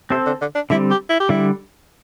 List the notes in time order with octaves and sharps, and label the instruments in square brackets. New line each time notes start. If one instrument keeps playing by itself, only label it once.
[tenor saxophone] C3 [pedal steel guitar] C4 A4 C5
[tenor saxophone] D3
D3
D4
[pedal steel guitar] D3 G3 C4 [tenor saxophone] E4
[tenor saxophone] G4
E4
G4
[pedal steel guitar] D3 G3 [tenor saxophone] E4